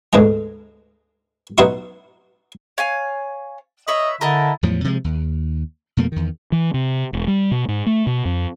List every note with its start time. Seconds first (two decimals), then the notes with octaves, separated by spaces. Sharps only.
0.13 D2 G#2 B2 G#3 A#5
1.58 B2 F#3 D#4 E4 C6 C#6
2.78 C#5 F5 G#5
3.88 B4 C#5 D#5 E5
4.21 D3 E4 A#4 D#5 A5
4.63 E2 A2 F3 F#3
4.84 C3 F3 G3 G#3
5.04 D#2
5.97 F2 B2 A3 A#3
6.12 E2 D#3
6.52 E3
6.74 C3
7.13 E1
7.28 G3
7.51 B2
7.68 G#2
7.86 A3
8.07 B2
8.25 F2